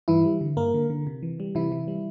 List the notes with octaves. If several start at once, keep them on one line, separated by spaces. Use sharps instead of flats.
G2 E3 E4
G3
D3
G2 A#3 A#4
D3
D3
C3
E3
G3
C3 E3 E4
E3
G3